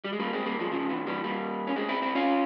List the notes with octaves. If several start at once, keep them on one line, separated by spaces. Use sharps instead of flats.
G3
G#3
G3 A#3
G#3 C4
G3 A#3
F3 G#3
C#3 F3
C3 E3
E3 G3
G3 A#3
C#4
G#3 C4
C4 E4
C4 E4
C#4 F4